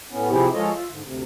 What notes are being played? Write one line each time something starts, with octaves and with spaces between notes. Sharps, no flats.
A2 B3 C#4
C3 F3 C4 E4 G4 G#4
F3 G#3 F4 A4 C#5 D#5
F4 E5
G#2 D3
D2 C3